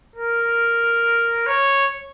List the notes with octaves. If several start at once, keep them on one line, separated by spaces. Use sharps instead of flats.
A#4
C#5